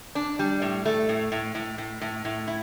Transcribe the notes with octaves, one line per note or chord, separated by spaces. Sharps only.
D4
G3
A2
A3
A2
A2
A2
A2
A2
A2
E4